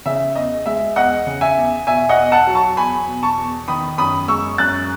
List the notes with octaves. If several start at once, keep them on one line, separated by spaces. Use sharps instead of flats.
C#3 E5
E2 D#5
G#3 E5
E2 D#5 F#5
C#3
E5 G#5
E2
B2 E5 G#5
D#5 F#5
E2
F#5 A5
F#3
A5 C#6
E2 G#5 B5
B2
A5 C#6
E2
D#3 B5 D#6
F#2 B5 D#6
G#3 C#6 E6
F#2 F#6 A6